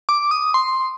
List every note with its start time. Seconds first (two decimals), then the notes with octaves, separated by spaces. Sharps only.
0.09 D6
0.31 D#6
0.54 C6